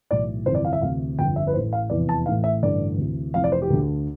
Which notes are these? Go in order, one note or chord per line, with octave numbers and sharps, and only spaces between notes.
B1 A2 E3 D5
G1 F2 C3 E3 C5
D5
F5
E5
D2 C3 E3 F5
G1 F2 D3 G5
E5
B4
A1 A2 E3 C5
F5
F1 E2 C3 E3 D5
A5
A1 A2 E3 F5
E5
A1 G2 D3 D5
D2 C3 E3
F1 F2 C3 E3 F5
D5
C5
G4
D2 D3